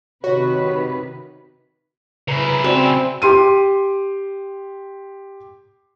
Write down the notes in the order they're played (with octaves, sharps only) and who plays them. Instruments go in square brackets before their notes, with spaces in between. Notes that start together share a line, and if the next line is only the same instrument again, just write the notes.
[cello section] C3 D#3 B4 [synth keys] F#4 [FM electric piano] C#5
[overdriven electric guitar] C#3 E4 [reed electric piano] B4 A#5
[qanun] C4 [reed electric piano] F#4 D5 G#5
[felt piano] G4 C6 D#7